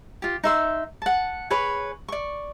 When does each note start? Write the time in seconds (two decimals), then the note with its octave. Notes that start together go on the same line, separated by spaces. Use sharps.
0.22 F4 G4
0.44 D#4 E5 C6
1.02 F#5 A5
1.50 G#4 B4 C#5 B5
2.08 D5 C#6